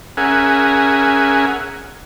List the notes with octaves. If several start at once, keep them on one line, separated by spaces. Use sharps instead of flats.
C#4 G#4 A#4 E5 F#5 G#5